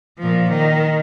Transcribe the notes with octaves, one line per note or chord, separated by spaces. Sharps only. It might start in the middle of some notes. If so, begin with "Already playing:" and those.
A#2 F3
D#3